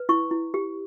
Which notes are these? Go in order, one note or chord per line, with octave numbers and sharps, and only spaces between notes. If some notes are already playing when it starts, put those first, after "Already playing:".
Already playing: B4
E4 C#6
E4
G4